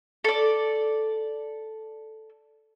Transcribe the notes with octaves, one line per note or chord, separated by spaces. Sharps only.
A4 D5